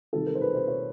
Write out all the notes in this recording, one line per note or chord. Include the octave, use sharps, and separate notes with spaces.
C3 D#3 G3 A4
A#4
C5
B4
C5
C#5